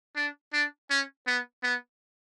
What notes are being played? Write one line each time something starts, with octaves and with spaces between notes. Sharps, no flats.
D4
D4
C#4
B3
B3